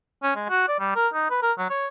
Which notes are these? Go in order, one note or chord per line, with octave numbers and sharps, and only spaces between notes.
C#4
G#3
F#4
D5
G3
A#4
D#4
B4
A#4
F#3
C#5